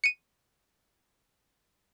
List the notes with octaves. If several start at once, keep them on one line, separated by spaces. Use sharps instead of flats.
C#7 D#7